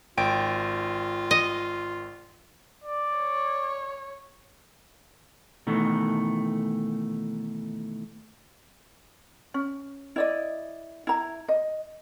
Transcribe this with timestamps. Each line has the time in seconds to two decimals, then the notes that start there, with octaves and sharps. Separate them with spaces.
0.18 G#1 F4 G5 D7
1.31 D#5
2.84 D5
3.17 C#5
5.67 B2 D#3 E3 A3
9.54 C#4
10.16 E4 D5 D#5
11.07 E4 A#5
11.48 D#5